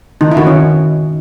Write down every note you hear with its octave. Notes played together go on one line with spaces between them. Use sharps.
D#3 D#4
E4
D#3 F#4
C#4